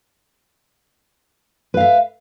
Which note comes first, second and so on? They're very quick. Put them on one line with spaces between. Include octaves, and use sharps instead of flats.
B4 F5 E5